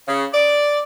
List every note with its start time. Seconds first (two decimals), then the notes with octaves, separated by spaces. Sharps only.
0.07 C#3
0.33 D5